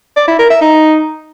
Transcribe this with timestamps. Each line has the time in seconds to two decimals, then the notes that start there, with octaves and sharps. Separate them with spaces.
0.17 D5
0.28 E4
0.39 A#4
0.50 E5
0.61 D#4